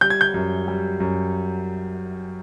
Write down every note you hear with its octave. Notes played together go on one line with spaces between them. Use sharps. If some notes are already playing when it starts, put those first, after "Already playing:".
G3 G6
G#6
G6
F#2
G3
F#2